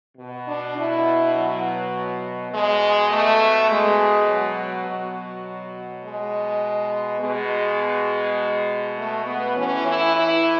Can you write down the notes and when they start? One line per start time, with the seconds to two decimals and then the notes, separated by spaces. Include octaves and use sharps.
0.17 B2
0.47 D4
0.76 E4
1.35 F#3
2.52 B2 G#3
3.11 A3
3.69 G#3
4.28 F#3
4.86 B2
6.04 G#3
7.21 B2 G#3
8.97 A3
9.26 B3
9.55 A2 E3 C#4
9.85 E4
10.14 E4